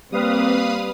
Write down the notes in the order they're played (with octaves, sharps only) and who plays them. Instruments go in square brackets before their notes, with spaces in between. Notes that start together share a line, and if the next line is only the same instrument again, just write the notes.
[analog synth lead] G3 [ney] A#3 [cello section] C4 [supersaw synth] B4 F5 D#6